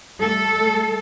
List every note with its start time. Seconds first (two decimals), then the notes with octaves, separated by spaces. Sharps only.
0.19 G3 A3 A4